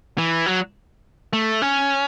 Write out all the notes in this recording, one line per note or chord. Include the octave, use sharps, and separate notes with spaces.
E3
F#3
A3
C#4